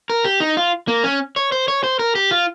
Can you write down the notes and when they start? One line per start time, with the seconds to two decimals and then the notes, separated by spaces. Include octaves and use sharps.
0.10 A#4
0.24 G4
0.40 D#4
0.57 F4
0.88 A#3
1.04 C#4
1.36 C#5
1.52 C5
1.68 C#5
1.84 C5
1.99 A#4
2.15 G4
2.31 F4